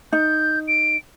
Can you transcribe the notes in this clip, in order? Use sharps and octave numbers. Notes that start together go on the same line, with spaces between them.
D#4 G6
D7